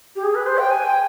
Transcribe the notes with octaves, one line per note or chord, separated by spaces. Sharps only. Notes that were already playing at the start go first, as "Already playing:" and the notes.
G4
G#4
B4
C5
G5
G#5
G5